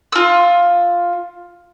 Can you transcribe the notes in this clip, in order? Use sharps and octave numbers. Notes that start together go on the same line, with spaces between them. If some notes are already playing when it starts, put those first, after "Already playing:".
F4 E6